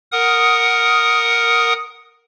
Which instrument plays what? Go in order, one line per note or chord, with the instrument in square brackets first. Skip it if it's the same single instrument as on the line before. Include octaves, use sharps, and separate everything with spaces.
[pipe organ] A#4 F#5 D#6